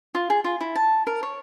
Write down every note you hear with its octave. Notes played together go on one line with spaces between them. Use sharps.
F4
G#4
F4
E4
A5
A#4
C#5